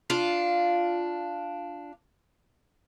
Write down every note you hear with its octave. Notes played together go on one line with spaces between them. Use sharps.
D4 F4 F5